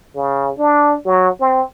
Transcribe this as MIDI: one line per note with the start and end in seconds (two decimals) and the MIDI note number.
0.15 0.52 49
0.58 0.95 62
1.06 1.30 54
1.40 1.61 60